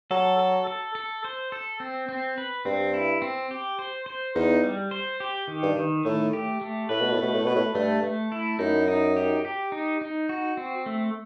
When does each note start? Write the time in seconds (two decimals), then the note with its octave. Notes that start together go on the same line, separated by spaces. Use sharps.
0.11 F#3 A4
0.39 A4
0.67 A4
0.95 A4
1.24 C5
1.52 A4
1.80 C4
2.09 C4
2.38 B4
2.65 G2 C4
2.94 E4
3.22 C4
3.51 G4
3.79 C5
4.06 C5
4.35 E2 D#4
4.64 G3
4.91 C5
5.20 G4
5.48 D#3
5.63 G2
5.76 D#3
6.05 A2 A3
6.33 G4
6.61 A3
6.89 A2 B4
7.00 B2
7.11 A2
7.17 A3
7.23 B2
7.34 A2
7.45 B2 B4
7.56 A2
7.74 G2 A3
8.03 A3
8.32 E4
8.59 F#2 D#4
8.88 D#4
9.16 G4
9.45 G4
9.72 D#4
10.01 D#4
10.29 F#4
10.57 C4
10.86 A3